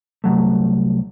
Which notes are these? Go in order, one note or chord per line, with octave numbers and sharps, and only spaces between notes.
C2 G#2 F#3 A3